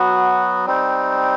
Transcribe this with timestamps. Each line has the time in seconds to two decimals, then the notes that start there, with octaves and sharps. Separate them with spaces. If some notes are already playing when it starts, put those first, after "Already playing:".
Already playing: F#3 B3 F#4
0.66 G3 C4 D#4